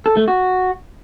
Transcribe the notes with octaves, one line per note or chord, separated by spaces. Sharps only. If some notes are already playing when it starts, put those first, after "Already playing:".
A4
A3
F#4